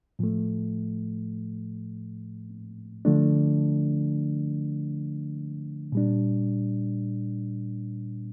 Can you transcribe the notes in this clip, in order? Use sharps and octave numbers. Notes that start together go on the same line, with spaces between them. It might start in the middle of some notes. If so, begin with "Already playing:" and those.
A2 F3 A3
D3 F3 A3 D4
A#2 G3 D4